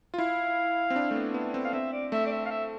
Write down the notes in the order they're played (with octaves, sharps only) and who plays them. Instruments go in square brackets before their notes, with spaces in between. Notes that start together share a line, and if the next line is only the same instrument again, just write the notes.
[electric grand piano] F4
[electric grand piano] E4 [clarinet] F5
[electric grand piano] C4
D4
A3
B3
B3
C4
[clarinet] F5
[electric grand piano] C4 [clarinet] E5
[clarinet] D5
[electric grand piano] A3 [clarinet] E5
[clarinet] D5
E5
F5
E5